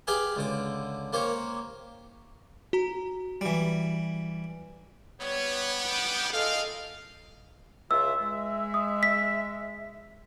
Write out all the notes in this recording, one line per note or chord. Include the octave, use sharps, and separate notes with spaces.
G4 G#4 B4 F5 G5 G#5
C#2 D3 D6
A#3 G4 C5 C#5
F#4 A#5
E3 G3
G3 B3 C#5
D6 G6
F4 G#4 A4 D#5 F5
C#2 F4 E5 E6
G#3 E5
D#6
B6